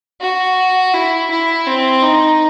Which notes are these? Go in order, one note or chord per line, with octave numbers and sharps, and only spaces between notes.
F#4
E4
E4
C4
D#4